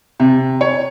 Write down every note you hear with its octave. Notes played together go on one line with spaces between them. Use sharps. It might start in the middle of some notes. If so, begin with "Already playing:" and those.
C3
C#5